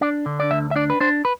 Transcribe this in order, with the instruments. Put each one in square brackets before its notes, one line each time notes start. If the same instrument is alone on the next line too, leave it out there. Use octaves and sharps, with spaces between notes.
[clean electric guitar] D4 D5
D3
D5
D2 E5
E5
D4 D5
B4
D4 C5
B4